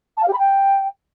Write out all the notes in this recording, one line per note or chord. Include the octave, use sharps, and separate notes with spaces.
A5
F5
G4
B5
G5